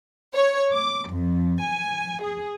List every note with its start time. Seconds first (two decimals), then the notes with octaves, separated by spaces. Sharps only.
0.34 C#5
0.73 D6
1.10 F2
1.63 G#5
2.23 G#4